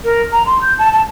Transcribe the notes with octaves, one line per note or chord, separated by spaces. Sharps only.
A#4
A#5
C6
G6
A5
A5